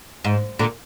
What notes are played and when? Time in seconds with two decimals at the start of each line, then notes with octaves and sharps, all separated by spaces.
0.24 G#2
0.59 A#2 D3